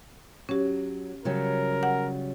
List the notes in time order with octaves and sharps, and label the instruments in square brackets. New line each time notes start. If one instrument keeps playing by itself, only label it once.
[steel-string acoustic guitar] F#3 [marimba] C#4 G4
[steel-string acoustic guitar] C#3 F#3 G3 [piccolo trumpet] A#4
[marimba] F#5